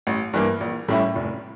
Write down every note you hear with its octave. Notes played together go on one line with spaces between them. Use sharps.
A1
G2 E3 A#3
A#1
A2 G3 C#4 E4
F1